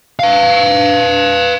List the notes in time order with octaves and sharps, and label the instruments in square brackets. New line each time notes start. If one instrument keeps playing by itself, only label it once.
[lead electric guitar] B4 F5